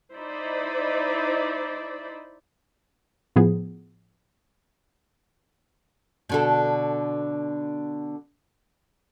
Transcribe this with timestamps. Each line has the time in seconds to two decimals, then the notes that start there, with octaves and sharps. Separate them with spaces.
0.14 D#4 E4 C5 D5 B5
3.36 A2 F3 B3 G#4
6.29 B2 D3 A4